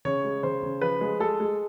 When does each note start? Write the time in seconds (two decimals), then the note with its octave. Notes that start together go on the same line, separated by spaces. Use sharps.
0.05 C#3 C#5
0.24 G#3
0.43 C#3 C5
0.63 C#3
0.81 F3 B4
1.01 G#3
1.20 G#3 A4
1.40 G#3